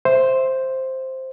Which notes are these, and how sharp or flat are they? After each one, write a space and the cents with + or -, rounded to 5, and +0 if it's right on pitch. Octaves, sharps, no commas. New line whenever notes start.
C5 +0 E5 +0